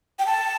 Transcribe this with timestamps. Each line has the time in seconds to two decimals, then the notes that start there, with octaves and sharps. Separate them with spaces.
0.19 G5
0.26 A5